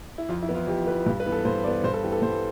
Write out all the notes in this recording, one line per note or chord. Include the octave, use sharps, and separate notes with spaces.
E4
F2 F4
E4
E3 B3
F4
F2 G4
E3 B3 B4
G2 G4
B4
E3 B3
A4
G2 C5
E3 B3 D5
G2 C5
A4
E3 B3 G4
A4
G2 C5